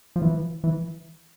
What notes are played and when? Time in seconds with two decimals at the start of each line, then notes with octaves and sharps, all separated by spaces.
0.16 F3
0.22 E3
0.64 E3